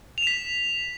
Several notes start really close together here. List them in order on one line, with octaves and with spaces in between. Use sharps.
F7 E7 B6